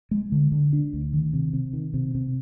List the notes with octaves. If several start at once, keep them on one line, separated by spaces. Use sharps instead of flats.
G#3
D3
D3
D4
D2
D#3
C3
C3
D#3
C3
C3